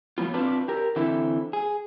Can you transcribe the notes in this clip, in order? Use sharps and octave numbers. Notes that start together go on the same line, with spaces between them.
F3 F#3 B3 F4
C4 D4 F4 B4 D5
G4 A#4
D3 E3 C4 E4
G#4